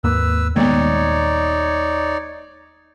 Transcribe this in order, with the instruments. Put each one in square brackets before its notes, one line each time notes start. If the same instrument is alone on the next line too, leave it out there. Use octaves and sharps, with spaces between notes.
[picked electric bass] D#2 G#2 A#3 [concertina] B4 E6
[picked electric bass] D#1 D#3 G#3 [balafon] A#3 B3 [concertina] D#4 C#5 D5